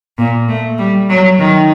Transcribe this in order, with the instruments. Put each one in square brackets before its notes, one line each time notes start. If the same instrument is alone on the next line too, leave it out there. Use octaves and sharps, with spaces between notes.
[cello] A#2
A3
G3
F#3
D#3